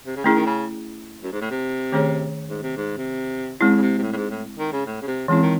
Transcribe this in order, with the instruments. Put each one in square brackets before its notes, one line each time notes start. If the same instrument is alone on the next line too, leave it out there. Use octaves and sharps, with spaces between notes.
[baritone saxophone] C3
C#3
[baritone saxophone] D#3 [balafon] A3 C#4 E4 G#4
[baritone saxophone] D#3
C#3
F#2
G#2
A2
C3
[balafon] D#3 A3 C#4 G#4 C#5
[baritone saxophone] G#2
C3
G#2
C3
[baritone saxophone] C#3 [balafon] G#3 C4 E4
[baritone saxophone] C#3
C3
C3
A2
A2
G#2
A2
D#3
C#3
A2
C#3
C3
[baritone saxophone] C#3 [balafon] E3 G#3 C4 E4
[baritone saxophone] D#3